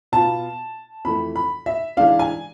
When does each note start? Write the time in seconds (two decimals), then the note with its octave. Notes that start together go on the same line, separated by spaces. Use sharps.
0.12 B2 B3 F4 A5
1.05 F2 E3 A3 B5
1.36 B5
1.66 E5
1.97 E3 G#3 D4 F5
2.19 G#5